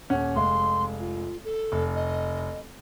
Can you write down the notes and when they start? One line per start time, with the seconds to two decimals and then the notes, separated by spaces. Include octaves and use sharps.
0.10 D#1 C#4 F#5
0.36 F1 G#3 F5 C6
1.00 F4
1.44 A4
1.72 F1
1.95 D#5